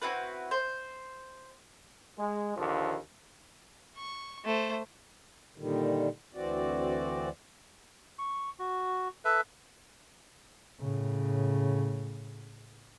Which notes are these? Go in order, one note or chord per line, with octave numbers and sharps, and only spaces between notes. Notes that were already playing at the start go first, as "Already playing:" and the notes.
C4 E4 F#4 B4
C5
G#3
A#1 D#2 D3 F3
C#6
A3 C5
A#2 D3 D#3 G3
D2 E3 C4 F#4 D5
C#6
F#4
A4 B4 E5
A2 C#3